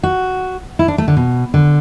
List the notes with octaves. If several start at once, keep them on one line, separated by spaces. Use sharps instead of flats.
F#4
E4
D4
A3
D3
B2
D3